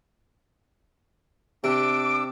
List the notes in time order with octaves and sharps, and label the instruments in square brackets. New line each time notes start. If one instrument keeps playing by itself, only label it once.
[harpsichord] C3 [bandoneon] D4 E6 [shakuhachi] D6 [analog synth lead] D7